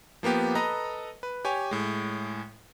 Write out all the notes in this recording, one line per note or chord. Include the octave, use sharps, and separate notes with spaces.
F3 A#3 B3 G4
A4 B4 D#5 A#5
B4
G4 C#5 G#5
A2 G#3